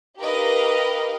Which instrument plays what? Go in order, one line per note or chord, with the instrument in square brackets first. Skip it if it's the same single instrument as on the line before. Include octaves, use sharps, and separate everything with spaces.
[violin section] D#4 G4 A#4 B4 D#5 F5